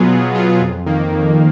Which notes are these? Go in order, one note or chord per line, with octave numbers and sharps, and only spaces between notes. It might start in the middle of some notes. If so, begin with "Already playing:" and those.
Already playing: B2 F#3 B3 F4 G#4
B2
F#3 B3 F4 G#4
F2
D#3 A#3
F2